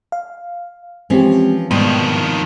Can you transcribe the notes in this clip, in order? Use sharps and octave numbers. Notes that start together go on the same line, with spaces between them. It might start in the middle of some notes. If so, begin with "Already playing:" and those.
F5
E3 F3 G#3 C4 C#4 G4
F2 G#2 B2 D#3 G3 B3